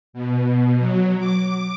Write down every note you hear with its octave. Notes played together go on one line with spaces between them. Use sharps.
B2
F#3
D6